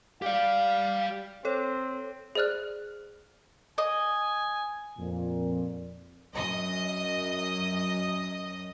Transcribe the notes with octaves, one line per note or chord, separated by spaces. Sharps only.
G4 D5 F5
C4 A4 C#5
G#4 C5 D5 F6 F#6
D#5 G#5
F2 A#2
F#2 D#5 D#6